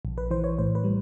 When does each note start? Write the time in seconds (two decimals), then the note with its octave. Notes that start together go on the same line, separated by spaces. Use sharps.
0.05 A#1
0.18 B4
0.31 E3 C5
0.44 C#5
0.58 A2 C5
0.75 B4
0.84 G3